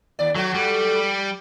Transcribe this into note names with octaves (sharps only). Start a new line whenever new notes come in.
D#2 D5
F#3 A3 F#4
G3